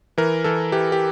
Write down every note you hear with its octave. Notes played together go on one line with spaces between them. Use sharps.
E3 A#4
E3 A4
E3 G4
G4